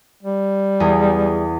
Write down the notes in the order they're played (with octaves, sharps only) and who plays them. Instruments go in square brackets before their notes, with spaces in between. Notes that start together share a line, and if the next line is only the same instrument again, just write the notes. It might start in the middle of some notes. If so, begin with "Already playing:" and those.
[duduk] G3
[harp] E2 G#4 A4